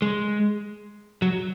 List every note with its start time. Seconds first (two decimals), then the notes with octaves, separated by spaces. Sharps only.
0.02 G#3
1.22 F#3